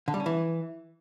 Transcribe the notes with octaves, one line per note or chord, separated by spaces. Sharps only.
D3
G3
C#4
E3